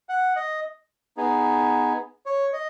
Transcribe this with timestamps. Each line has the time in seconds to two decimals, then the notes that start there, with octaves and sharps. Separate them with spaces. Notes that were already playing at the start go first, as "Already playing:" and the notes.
0.09 F#5
0.36 D#5
1.17 B3 D#4 G#4
2.26 C#5
2.53 D#5